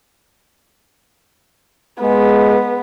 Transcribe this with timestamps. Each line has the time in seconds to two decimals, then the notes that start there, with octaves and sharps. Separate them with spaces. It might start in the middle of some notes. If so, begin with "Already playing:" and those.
2.00 G#3 B3